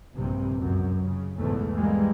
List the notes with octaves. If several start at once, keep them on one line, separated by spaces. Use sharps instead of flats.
A#1 G2 C3
C#2 F#2 F#3
C#3
B1 E2 G#2 C#3 A3
E3 G3 G#3 A#3